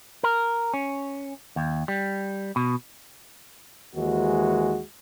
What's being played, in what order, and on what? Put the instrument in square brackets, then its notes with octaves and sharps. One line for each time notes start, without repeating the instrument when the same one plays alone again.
[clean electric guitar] A#4
C#4
D#2
G3
B2
[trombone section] D#2 D#3 E3 G#3 F#4